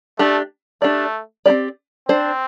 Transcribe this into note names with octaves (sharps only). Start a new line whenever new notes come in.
A3 D4 G4 D5
A3 D4 G4 D5
C4 E4 G4 D5
C4 D4 C5